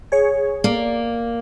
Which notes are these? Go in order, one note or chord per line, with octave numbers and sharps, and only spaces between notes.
G#4 C#5
A#3 D5